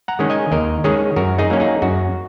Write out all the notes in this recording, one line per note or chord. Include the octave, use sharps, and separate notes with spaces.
F#5 A#5
D#3 G#3 C#4
D#5 G#5
D#2 A#4 D#5
D#3 G#3 C#4 G#4 C#5
F#2 F#4 A#4
D#4 G#4
F#3 A#3 C#4
D#4 G#4
F#2 F#4